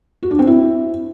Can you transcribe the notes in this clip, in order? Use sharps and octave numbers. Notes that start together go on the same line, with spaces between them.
F#4
D4
C4
E4